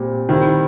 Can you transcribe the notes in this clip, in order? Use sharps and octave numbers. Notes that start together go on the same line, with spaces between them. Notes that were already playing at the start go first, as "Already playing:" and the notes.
Already playing: A#2 G3 C4
D#3 G3 C4 E4